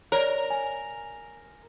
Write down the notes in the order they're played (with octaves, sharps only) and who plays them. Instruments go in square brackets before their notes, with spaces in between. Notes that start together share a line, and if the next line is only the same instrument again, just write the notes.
[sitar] A#4 [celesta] C#5 D5
[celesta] G#5